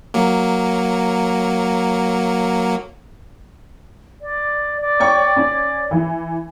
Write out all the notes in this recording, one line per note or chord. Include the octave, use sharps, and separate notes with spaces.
F#3 A#3
D5
D5
C#5 G5 C#6
C#4
E3